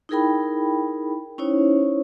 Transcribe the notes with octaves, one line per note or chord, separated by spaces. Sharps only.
D#4 E4 G#4 A#4 G5 B5
C#4 D#4 E4 C5 C#5